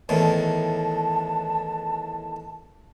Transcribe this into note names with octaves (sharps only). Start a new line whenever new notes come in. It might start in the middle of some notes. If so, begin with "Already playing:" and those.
E2 A2 D#3 A5